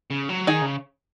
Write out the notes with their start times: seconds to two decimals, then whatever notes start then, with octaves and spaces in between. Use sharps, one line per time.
0.10 C#3
0.29 F#3
0.47 D#3 D#4 G#4
0.62 C#3